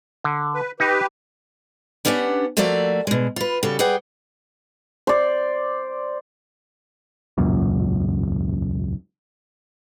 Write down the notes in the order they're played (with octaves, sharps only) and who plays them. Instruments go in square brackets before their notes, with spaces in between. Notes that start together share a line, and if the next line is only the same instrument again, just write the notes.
[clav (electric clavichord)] D3
[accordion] B4
[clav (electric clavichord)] D#4 [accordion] G4 B4
[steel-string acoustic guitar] B3 C#4 D4 G4 E5 F#5
F3 A3 A#3 F#4 D5 E5
B2 G#3
F4 B4
C#3 G3 F#4 A4
G#4 B4 D5 F#5 G5
[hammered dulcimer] C5 D5
[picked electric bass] E1 C#2 F#2 A#2